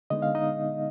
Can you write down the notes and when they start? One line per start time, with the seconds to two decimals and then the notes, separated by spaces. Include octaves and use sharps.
0.10 D3 G#3 B3 D#4 D#5
0.22 F5
0.35 D#4 D#5